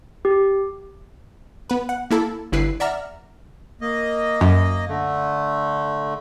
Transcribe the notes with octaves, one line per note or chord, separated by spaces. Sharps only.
G4
B3 B4
F#5
A#3 E4 A4
G1 E4 B4 C7
D5 E5 F#5 A#5 F6
A#3 D#5
F#2
D3 A3